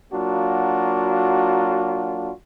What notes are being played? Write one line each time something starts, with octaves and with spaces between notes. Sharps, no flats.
F#3 A#3 D4 F4 F#4